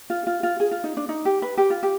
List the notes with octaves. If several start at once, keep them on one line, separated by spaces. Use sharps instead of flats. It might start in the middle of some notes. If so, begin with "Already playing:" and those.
F4
F4
F4
G#4
F4
D#4
D4
D#4
G4
B4
G4
F4
G4